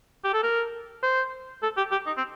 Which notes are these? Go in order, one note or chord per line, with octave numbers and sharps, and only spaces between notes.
G4
A4
A#4
C5
A4
G4
G4
D#4
C4